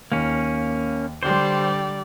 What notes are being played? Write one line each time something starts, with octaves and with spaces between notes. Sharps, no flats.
D#2 A#3 C#4
D3 G3 G4 C5 D5 C6